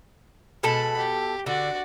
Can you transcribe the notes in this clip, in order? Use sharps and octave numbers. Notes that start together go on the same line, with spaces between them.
B2 G#3 A4 A5 B5
G4
D3 F#4 D5